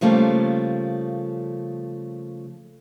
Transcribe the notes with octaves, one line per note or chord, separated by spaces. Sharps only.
C#3 F3 G3 A3 A#3